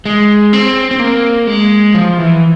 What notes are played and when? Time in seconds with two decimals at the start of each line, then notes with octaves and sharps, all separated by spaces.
0.05 G#3
0.53 C4
0.91 C4
0.99 A#3
1.47 G#3
1.94 F3
2.18 E3